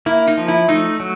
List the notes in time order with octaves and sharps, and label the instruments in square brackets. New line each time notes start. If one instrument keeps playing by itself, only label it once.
[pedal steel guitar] A#3 [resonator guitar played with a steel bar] E4
[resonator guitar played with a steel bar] D#4
[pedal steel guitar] F3
[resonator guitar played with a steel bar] E4
[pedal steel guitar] A3 [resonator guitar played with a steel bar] D#4
[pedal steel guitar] F#3